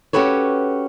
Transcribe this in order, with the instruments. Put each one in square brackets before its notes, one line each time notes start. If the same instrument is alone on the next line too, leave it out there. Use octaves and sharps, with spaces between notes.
[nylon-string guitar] C#4 F#4 G4 A4 B4 C#5